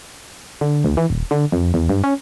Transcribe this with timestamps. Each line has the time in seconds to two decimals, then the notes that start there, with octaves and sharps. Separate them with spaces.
0.61 D3
0.84 D2
0.97 E3
1.10 D#1
1.31 D3
1.52 F2
1.74 E2
1.89 G2
2.04 C#4